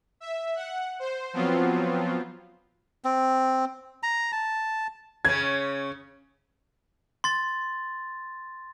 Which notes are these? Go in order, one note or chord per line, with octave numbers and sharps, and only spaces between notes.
E5
F#5
C5
F3 F#3 B3 C4 F4
C4
A#5
A5
C#3 C#4 G#6
C6 A6